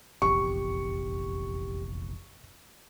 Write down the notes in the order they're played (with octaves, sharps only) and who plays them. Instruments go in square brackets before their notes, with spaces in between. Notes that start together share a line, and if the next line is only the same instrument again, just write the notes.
[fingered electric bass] F1 A#1 E2 [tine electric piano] G4 [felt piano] C#6